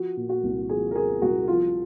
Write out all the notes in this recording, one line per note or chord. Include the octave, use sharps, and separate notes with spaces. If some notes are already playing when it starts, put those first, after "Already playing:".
Already playing: F3 F#4
A#2
F#4
C2
F3 G#4
A#4
F3 G#4
C2 F#4
F3 F4